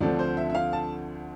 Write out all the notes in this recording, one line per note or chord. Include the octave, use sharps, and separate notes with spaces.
D2 D3 F3 A3 C4 D5
C5
E5
E5
F5
A5